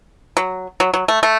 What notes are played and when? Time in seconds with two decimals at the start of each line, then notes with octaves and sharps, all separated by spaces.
0.37 F#3
0.80 F#3
0.94 F#3
1.08 A3
1.23 A3